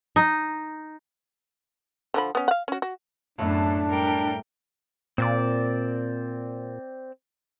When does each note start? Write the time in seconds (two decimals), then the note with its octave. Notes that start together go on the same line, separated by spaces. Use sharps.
0.16 D#4
2.14 D3 F3 B5
2.35 B3 C#4
2.48 F5 F#5
2.68 C#4 F#4
2.82 F#4
3.38 F#2 A2 A3 B3 D4 E5
3.89 G3 A#4 G5
5.18 A#2 C4 D5